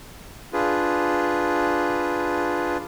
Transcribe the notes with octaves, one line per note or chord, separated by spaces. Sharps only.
D4 F4 G#4 B4